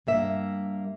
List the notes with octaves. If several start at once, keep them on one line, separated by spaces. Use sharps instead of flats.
G2 A#3 E5